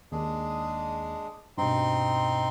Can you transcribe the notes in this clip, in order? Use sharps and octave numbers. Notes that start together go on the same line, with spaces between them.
D#2 G#3 D4 G#4
G2 B2 C4 D#4 C6